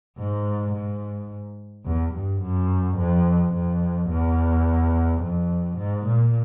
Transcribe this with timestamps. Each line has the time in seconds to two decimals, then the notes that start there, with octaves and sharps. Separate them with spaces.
0.18 G#2
0.73 G#2
1.85 E2
2.14 G2
2.41 F#2
2.98 F2
3.54 F2
4.09 E2
5.22 F2
5.77 G#2
6.06 A#2